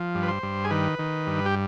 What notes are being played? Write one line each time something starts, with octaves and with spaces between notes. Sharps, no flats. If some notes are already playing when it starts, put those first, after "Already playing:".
Already playing: F3
G2
B4
C5
G2
G#4
D#3 B4
D#3
G2
G4